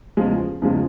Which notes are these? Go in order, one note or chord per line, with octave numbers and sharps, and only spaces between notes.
E2 C#3 F3 G#3
E2 C#3 F3 G#3